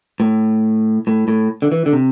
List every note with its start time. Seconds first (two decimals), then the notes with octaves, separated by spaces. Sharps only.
0.20 A2
1.07 A2
1.28 A2
1.62 D3
1.72 E3
1.86 D3
1.93 C3